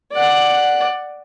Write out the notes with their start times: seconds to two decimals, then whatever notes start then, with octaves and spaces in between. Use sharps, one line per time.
0.12 D5 F#5